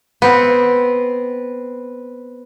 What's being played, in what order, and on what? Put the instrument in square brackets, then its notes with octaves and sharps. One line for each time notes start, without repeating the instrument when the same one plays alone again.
[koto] B3 C4